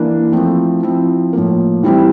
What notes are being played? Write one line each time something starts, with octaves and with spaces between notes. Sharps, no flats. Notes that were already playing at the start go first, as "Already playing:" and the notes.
Already playing: E3 A#3 D4
F3 A3 C4 E4
F3 C4 E4
A2 F3 A#3
E3 G3 C4 E4